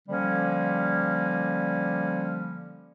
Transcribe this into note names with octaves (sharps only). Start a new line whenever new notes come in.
D3 F3 G3 A#3 C#4